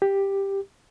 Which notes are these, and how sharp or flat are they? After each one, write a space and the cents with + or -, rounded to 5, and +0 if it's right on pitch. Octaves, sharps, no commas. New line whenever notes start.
G4 +5